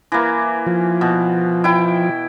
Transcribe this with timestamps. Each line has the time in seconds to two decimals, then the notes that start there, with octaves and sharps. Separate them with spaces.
0.12 E3 A#3
0.67 F3
1.01 B2
1.64 E4 G5